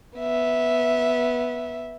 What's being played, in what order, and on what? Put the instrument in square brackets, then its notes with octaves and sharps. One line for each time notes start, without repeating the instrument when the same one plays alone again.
[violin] B3 E5